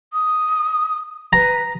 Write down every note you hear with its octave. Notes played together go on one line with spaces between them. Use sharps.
D#6
B4 A#5